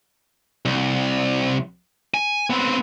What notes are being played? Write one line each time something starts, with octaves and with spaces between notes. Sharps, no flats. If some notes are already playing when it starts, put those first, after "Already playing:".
C2
G#5
B3 C4